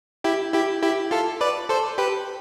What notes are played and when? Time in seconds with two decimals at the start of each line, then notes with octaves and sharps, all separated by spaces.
0.24 E4 G4
0.53 E4 G4
0.83 E4 G4
1.11 F4 A4
1.41 B4 D5
1.69 A4 C5
1.98 G4 B4